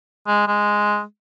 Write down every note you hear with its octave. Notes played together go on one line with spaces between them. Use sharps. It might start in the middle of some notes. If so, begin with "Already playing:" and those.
G#3
G#3